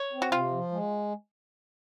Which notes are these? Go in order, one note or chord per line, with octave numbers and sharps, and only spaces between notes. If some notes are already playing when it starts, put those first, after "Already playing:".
Already playing: C#5
C4
F#4
C3 F4
F3
G#3